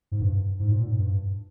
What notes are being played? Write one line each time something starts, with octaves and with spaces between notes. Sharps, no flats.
G#2
G2
G#2
A#2
G#2
G2